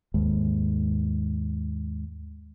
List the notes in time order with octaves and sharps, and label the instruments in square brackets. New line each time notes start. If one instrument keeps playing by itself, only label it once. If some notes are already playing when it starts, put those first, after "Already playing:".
[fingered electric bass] D#2 G#2